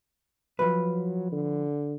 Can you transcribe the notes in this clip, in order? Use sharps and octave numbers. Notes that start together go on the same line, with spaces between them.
F3 F#3 B4
D3